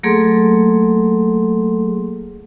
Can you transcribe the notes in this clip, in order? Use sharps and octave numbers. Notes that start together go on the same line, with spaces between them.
F#3 A3 A#3 G#4 A4 C6